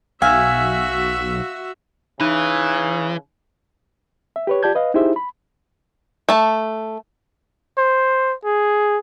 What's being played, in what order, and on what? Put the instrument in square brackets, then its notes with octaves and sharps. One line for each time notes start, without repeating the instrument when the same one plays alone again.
[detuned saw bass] B1 [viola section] F#4 E5 [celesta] F5 E6 F6 [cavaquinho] G#5
[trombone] C#3 [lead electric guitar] E3 [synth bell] D#4
[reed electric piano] E5
G4 B4 C#5
F4 G4 D5 A5 G6 G#6
B4 D#5 F5
D#4 E4 G4 G#4 C5 E5
B5
[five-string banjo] A3 A5
[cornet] C5
G#4